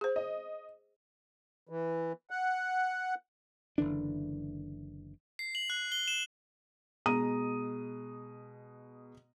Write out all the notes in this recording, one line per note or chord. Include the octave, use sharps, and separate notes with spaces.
G#4 C5
D#5
E3
F#5
F#1 D3 E3 D4
C7
F#7
F#6
G7
E7
B2 G#3 A#5 D#6 D#7